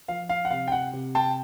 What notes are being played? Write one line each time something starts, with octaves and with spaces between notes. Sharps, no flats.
F3 F5
F5
F#5
C3 F5
G5
F#5
C3
G5 A5